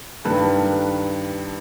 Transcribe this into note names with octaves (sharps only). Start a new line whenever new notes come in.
G2 D#3 A4 B4